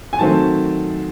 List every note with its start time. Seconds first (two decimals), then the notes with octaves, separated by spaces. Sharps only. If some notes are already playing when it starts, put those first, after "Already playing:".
0.13 G#5
0.19 D#3 F#3 A3 C4 A5